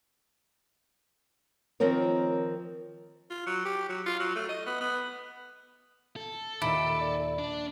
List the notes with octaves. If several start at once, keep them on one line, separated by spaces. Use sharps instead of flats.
D#3 F3 C4 A#4 C#5
F4
F#3
G4
F#3
F4
F#3
A3
D#5
B3
B3
A4
D#2 A#2 D#3 E4 D6
D5
D4